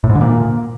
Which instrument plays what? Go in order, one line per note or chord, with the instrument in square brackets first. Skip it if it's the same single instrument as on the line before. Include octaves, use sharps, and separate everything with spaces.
[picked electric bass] A2
G#2
D3
A#2